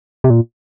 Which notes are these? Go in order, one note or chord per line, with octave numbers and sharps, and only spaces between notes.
C3
A#2